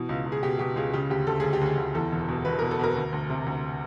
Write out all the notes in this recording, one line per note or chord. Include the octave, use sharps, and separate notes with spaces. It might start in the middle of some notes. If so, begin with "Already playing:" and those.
Already playing: B2 E3
C#2
C#2
G#4
B2 G4
B2 G4
C#2 G#4
C#3 G4
D2 G4
D2 A4
D2 G#4
G4
D2 G#4
D2
E2 A4
E1
B2
E1 B4
B2 A#4
A4
B2 A#4
D2
D2
C3
D2